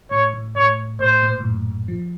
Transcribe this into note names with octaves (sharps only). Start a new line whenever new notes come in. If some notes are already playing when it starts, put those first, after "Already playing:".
A2 C#5
A2
A2 C#5
A2 C5
A#2
A2
F#2
F3